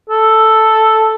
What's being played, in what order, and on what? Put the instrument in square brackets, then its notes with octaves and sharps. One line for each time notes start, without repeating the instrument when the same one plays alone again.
[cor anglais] A4